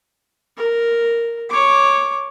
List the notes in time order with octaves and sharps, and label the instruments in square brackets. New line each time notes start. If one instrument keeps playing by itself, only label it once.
[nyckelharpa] A#4
C#5 D6